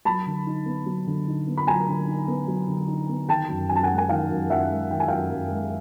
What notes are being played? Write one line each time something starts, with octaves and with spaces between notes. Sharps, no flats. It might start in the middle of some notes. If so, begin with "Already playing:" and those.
F#3 A5 B5
D3
D#4
B3
F#3
D3
D#4
B3
B5
F#3 G#5 A#5
D3
D#4
B3
F#3
D3
D#4
B3
D#3 G5 A5
F#2
F#2 G#5
A5
F#5 G#5
G#3
G#5
D#3 F5 G5
F#2
F#2 E5 F#5
G#3
D#3 G5
G#5
F#2 F5 G5
F#2
G#3